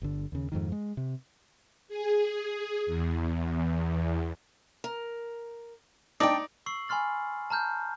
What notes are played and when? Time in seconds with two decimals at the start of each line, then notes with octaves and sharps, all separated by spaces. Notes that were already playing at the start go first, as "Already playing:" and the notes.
0.02 G1 D3
0.32 D#2 C#3
0.52 F2 G#2 D#3
0.72 G#3
0.97 C3
1.88 G#4
2.86 E2
4.84 A#4
6.20 D4 D#4 D5 G5
6.66 C#6 E6 C7 F#7
6.88 G#5 B5 C6 F6 A6 F#7
7.50 A5 A#5 F6 G6